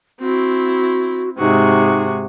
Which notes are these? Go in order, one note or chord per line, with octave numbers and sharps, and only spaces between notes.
C4 E4 F#4
G#2 C3 D#4 F#4 G#4